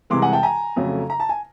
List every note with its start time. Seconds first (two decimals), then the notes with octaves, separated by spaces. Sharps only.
0.10 C2 C3 E3 G#3 C6 D6
0.22 F#5 G#5
0.33 G5 A5
0.43 G#5 A#5
0.76 F2 C#3 F#3 A3
1.10 A#5
1.20 A5
1.29 G#5